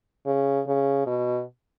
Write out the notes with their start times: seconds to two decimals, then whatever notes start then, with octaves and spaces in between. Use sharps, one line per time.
0.26 C#3
0.67 C#3
1.06 B2